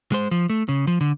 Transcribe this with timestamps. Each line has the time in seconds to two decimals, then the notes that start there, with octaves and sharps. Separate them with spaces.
0.12 G#3 C5
0.31 F3
0.50 A3
0.69 C#3
0.87 F3
1.01 D3